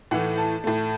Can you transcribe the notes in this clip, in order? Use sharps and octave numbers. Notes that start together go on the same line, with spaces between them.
A2 E3 A3 F#5
A5
A2 A3